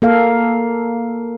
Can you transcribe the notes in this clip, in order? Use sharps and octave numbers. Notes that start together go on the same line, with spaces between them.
A#3 A4 F5